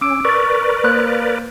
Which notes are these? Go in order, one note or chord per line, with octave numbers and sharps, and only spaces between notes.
C#4 D6 E6 D7
A#4 B4 D5 C#6 A6
A#3 C5 F#6